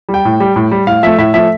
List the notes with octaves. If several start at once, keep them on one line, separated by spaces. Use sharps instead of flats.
G3
G5
A2
G3
A2
G3
A2 F5
F3 A3 E5
A2 E5
F3 A3 E5